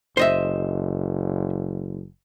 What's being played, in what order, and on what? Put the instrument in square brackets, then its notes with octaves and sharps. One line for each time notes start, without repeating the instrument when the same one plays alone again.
[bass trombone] F#1 [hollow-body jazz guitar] C5 D#5 E5